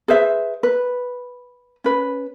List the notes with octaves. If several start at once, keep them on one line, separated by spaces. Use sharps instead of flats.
G#4 B4 C5 E5
B4
C#4 B4